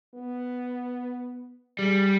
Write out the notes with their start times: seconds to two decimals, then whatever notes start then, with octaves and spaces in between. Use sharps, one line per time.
0.14 B3
1.79 G3 G#4